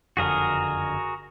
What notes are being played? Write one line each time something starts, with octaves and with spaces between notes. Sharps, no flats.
F#1 F2 D3 F#4 G#4 A#4